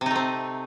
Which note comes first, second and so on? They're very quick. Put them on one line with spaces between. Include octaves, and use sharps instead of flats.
C3 D#4 A3 C4